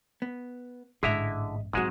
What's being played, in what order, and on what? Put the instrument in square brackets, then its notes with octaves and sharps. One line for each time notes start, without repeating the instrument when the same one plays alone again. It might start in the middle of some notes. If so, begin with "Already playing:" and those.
[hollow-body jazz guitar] B3
[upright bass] A1 G#2 [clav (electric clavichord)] D3 E4 A#5 [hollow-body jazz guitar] G#4 D#5 E5
[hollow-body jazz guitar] B1 F#4 [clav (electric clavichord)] G#2 G#3 [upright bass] F#3 C4